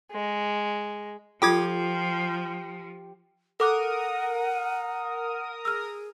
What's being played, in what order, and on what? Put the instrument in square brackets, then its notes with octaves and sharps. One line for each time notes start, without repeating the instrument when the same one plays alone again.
[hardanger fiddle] G#3
[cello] F3 [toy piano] F4 A4 D#6 [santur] G4 [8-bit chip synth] G5 D6 G#6
[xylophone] A4 D6 F#6 [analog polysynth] A#4 D#6 [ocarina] F#5
[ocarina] G#4 [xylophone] E6 F6